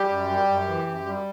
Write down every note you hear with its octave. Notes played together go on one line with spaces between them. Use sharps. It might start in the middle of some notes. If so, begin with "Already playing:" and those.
Already playing: G3 G4
F#2
G3
F#2
E3
F#2
G3